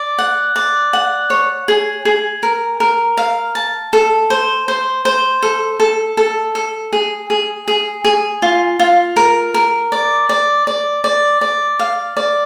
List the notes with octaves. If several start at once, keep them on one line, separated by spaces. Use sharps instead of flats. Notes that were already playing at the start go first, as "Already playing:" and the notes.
Already playing: D5
F#5
D5
F#5
C#5
G#4
G#4
A#4
A#4
F5
A5
A4
C5
C5
C5
A4
A4
A4
A4
G#4
G#4
G#4
G#4
F4
F4
A#4
A#4
D5
D5
D5
D5
D5
F5
D5